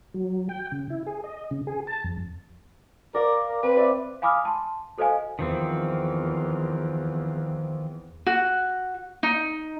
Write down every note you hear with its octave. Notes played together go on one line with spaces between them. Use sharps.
F#3
G5
C#3
E4
G#4
D#5
C#3
G#4
A5
F2
A#4 D5 F5
A#4
C4 B4
D5 E5
F5 G#5 B5 D6 D#6 F6
A5 C6
F#4 A4 C5 D#5 F5 G#5
E2 D#3 F3 C4
F#4
D#4